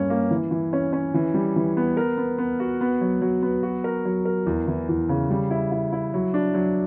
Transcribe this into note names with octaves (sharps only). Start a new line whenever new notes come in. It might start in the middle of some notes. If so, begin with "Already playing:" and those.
Already playing: G2 A#3 C#4
A#3
E3
E3
C#4
C#4
E3
G3
E3
B3
A#4
B3
B3
F#4
B3
F#3
F#3
B3
F#4
A#4
F#3
A#4
E2
E3
E2
C#3
G3
E4
E4
E4
F#3
D4
F#3